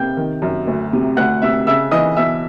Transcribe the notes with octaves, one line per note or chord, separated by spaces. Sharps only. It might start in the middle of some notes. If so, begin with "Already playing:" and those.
Already playing: C3 G5 G6
D#3
F#2
D2
C3
D2 F#5 F#6
C3 E5 E6
C#3 E5 E6
E3 D#5 D#6
B1 E5 E6